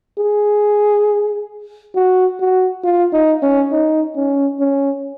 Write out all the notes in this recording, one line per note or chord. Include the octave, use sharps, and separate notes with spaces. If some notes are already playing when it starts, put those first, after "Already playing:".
G#4
F#4
F#4
F4
D#4
C#4
D#4
C#4
C#4